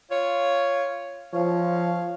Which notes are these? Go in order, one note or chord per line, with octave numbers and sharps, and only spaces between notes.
F4 C#5
F3 C#5 F5